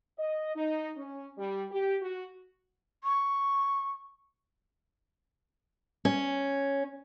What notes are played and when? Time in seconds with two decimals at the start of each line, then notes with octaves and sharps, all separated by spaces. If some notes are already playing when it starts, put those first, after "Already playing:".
0.19 D#5
0.55 D#4
0.97 C#4
1.38 G3
1.71 G4
2.02 F#4
3.04 C#6
6.05 C#4